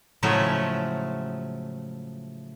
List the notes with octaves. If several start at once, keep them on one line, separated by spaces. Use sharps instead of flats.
A2 C#3 F3 F#3 G#3 A3